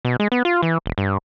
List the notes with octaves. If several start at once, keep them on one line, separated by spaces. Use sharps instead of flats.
B2
G#3
B3
F4
E3
E1
G2